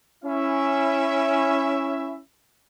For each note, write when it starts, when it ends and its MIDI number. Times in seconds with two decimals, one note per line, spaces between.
0.24 2.19 61
0.24 2.19 64
0.24 2.19 76